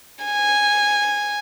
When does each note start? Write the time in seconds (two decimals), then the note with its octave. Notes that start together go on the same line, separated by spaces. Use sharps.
0.25 G#5